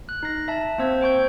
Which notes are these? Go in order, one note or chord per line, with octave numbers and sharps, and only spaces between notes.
F#6
D#4 A#6
E5 A5
A#3 C4 C5 E6 G#6
C5 G5 C#6 G6